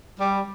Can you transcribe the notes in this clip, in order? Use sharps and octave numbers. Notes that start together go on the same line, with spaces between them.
G3